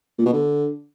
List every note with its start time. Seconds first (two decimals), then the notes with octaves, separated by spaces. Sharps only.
0.19 A#2
0.26 B2
0.33 D3